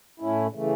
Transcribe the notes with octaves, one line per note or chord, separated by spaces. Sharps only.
A2 A3 C#4 E4
C#3 E3 A3